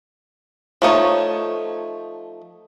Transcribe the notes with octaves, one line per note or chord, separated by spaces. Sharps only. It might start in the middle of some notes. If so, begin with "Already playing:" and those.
F3 A3 D#4 C#5